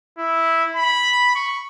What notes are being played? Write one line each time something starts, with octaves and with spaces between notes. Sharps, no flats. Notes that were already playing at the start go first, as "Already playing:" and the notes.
E4
B5
C#6